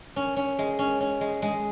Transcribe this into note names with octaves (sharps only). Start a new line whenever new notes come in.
C#4
C#4
G#3
C#4
C#4
G#3
G#3